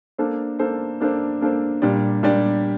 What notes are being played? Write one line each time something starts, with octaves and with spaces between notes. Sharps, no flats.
A#3 D4 A4 C5
A#3 D4 A4 C5
A#3 D4 A4 C5
A#3 D4 A4 C5
A#2 G3 D4 G4 D5
A#2 G3 D4 G4 D5